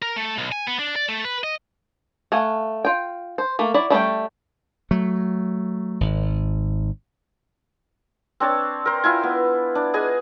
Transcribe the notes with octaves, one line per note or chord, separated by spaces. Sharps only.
A#4
A3
B1
G#5
B3
D4
D5
A3
B4
D#5
A3 F5 F#5 G#5
F4 G5
C5
A3 A#3
F#3 E4 D5
G3 A3 C#4 G5
F#3 A3
G#1
C4 D4 C#5 A5
A#4 C5
E4 F4 G#5
B3
D4
G#4 B4 D#5 G#5